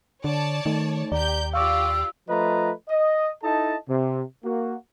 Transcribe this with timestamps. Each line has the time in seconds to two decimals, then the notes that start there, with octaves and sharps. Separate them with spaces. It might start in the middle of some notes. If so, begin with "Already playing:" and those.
0.24 D3 C#5 D5 A5
0.66 D#3 A3 D#4
1.12 D#2 G4 D5 A#5 G6
1.54 F4 G4 D5 F5 C#6 D6 E6
2.29 F3 A3 F4 B4 D#5 A#5
2.89 D#5
3.44 D#4 E4 A4 D#5 A5
3.89 C3
4.44 A#3 F#4